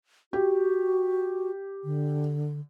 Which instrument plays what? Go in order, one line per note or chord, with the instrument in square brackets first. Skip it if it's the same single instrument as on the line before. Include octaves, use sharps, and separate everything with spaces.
[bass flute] F#4 [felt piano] G4
[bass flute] D3